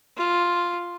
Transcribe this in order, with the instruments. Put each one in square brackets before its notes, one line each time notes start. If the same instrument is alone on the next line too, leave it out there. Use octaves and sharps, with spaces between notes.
[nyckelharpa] F4